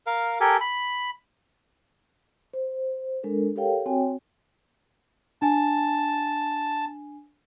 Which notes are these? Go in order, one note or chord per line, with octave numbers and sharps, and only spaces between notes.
A#4 F5
G4 A4 A#4 G#5
B5
C5
G#3 D4 A4 A#4
G4 A4 A#4 C#5 F5 G5
C4 F#4 C#5 G5 G#5
D4 G#5 A5